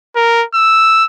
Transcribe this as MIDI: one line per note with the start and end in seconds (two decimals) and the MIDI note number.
0.16 0.44 70
0.55 1.04 88